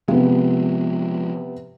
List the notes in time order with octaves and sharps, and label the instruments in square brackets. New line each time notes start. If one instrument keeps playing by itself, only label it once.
[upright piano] C3 B3 [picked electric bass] F3 G#3